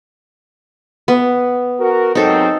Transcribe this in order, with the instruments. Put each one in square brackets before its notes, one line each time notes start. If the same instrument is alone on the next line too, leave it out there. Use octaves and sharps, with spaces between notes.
[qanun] B3
[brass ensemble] F#4 A#4
[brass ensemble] G#2 F#3 C4 [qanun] D#4 A4